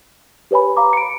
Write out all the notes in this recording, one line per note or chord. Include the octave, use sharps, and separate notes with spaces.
G4 B4 C#5 G#5 B5
F5 A#5 D6
C#7 D7